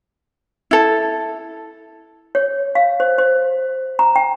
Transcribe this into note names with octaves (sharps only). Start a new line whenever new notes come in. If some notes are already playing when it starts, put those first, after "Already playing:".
E4 A4
C#5
F5
C5
C5
A#5
G5